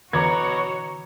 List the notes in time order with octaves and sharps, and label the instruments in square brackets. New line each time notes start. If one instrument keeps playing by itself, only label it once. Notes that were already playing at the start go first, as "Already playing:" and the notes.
[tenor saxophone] B2 [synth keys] D3 E3 [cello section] F#4 C#5 [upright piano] A#5 D6 G#6